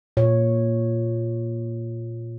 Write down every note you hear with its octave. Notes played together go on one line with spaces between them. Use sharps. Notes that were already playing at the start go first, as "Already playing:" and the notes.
A#2 C#5